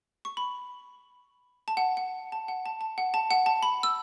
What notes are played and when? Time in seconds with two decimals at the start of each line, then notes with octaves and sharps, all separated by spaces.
0.25 C#6
0.37 B5
1.68 A5
1.77 F#5
1.97 F#5
2.32 A5
2.48 F#5
2.66 A5
2.81 A5
2.98 F#5
3.14 A5
3.31 F#5
3.46 A5
3.63 B5
3.83 E6